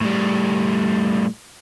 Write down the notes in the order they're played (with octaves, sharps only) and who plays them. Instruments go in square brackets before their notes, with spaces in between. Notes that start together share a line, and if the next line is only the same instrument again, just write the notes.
[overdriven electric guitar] A2 G3